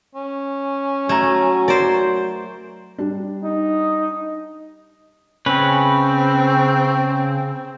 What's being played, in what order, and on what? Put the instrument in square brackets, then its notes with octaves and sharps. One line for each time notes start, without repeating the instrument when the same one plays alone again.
[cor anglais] C#4
[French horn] F#3 [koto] A3 [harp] A#5 G#6
[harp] A#4 G#6 [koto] C5 D5
[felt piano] G3 D4
[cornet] D#4
[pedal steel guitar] C#3 C#4 B4 [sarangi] C4